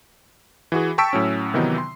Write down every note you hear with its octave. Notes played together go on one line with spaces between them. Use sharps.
E3 F#4 G#4
G5 A5 C#6 E6 B6 D7
A2 F#3 C#4
C3 D#3 E3 F#3 B3 D#4
C6